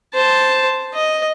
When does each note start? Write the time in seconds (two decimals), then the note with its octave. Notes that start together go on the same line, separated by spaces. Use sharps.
0.14 C5 A5
0.94 D#5